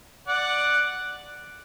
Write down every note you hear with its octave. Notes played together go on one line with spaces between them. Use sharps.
D5 F#5